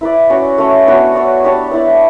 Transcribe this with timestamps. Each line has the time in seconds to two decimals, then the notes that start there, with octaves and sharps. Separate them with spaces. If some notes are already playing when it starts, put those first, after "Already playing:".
0.01 E4 B4 D5
0.30 C#4 F#4 C#5
0.58 A3 C#4 F#4 C#5
0.87 B3 D4 F#4 C#5
1.15 D4 F#4 C#5
1.44 B3 D4 G4 C#5
1.71 B3 E4 B4 D5